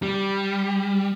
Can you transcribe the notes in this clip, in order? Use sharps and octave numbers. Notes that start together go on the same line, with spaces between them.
G3